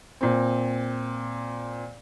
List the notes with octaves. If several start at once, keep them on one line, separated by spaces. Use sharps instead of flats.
A#2 C4